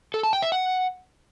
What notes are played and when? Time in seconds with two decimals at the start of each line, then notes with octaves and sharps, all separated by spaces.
0.14 A4
0.23 A5
0.33 G5
0.42 E5
0.52 F#5